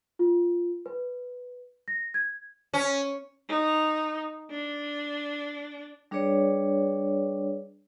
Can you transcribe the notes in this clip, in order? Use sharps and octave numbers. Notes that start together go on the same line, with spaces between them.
F4
B4
A#6
G#6
C#4
D#4
D4
G3 D4 G#4 B4 C#5 D5